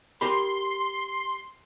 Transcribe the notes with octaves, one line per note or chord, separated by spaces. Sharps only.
G4 A#4 B5 C6